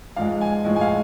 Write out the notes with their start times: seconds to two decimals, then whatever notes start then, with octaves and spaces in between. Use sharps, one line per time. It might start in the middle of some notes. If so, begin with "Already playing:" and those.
0.16 G#2 F3 G#3 F5
0.41 G#5
0.65 A2 F3 G#3
0.76 G#5
0.81 F5